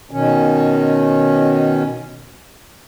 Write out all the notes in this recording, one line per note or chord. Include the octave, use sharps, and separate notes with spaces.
B2 D#3 C#4